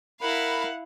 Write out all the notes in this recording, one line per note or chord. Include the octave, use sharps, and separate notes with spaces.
E4 A#4 F5 F#5 B5